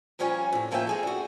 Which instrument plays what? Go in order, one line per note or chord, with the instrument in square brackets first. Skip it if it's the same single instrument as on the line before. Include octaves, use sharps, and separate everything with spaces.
[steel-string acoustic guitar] A#2 F3 G3 C#4 C#5 G#5
A2 C3
A2 F3 A#3 C#4 E5 G5
G#3 G#4 A4
D4 F#4